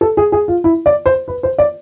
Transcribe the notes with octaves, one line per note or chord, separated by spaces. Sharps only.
A4
G#4
G#4
F4
E4
D5
C5
B4
C5
D5